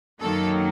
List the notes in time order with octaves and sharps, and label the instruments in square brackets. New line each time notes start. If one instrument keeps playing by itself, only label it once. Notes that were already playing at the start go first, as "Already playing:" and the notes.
[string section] F#2 D#3 F#3 A#3 A4